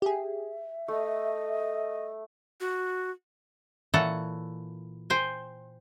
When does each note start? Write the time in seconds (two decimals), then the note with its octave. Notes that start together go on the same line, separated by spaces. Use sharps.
0.02 G4 G#4 E5
0.88 A3 D#5
2.60 F#4
3.94 A#2 E3 A4 C#5 F#5 A5
5.10 C5 G5 G#5